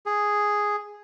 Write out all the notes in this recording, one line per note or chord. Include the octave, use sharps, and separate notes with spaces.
G#4